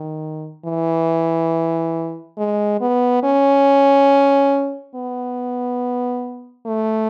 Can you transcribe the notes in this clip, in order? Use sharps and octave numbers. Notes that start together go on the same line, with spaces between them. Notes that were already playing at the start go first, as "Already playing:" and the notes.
Already playing: D#3
E3
G#3
B3
C#4
B3
A3